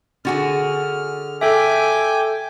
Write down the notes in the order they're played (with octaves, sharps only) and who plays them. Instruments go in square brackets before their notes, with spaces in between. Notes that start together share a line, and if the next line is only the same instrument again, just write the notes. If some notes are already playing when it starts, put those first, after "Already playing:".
[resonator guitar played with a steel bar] D3 F#4 G#4 [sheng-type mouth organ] F6
[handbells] A4 E5 [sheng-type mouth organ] G5 G#5 D6